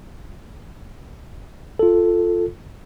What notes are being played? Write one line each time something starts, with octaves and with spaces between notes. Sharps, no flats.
F4 A4